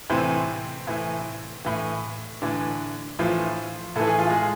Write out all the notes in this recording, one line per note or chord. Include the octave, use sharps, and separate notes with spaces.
A2 C3 E3 C4
A2 E3
A2 E3
A2 D3 E3 D4
A2 E3 F3 F4
A2 E3 A4
G#4
F4
G#3 G#4